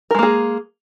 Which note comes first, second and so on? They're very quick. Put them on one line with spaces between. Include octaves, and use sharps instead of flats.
A#4 G#3 A#3 G#4